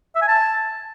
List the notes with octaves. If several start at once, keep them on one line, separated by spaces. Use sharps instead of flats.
E5
G#5
A5